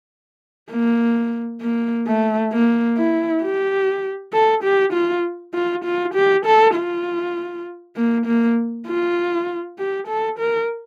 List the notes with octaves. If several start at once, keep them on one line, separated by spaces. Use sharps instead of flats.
A#3
A#3
A3
A#3
E4
G4
A4
G4
F4
F4
F4
G4
A4
F4
A#3
A#3
F4
G4
A4
A#4